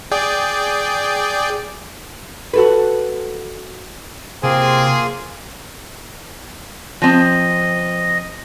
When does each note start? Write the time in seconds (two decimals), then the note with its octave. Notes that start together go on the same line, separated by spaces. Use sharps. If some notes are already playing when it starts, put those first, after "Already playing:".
0.11 G#4 D5 G5
2.54 F#4 A4 B4
4.43 C3 A#3 C4 F4 G#4 C6
7.02 F3 C4 D#5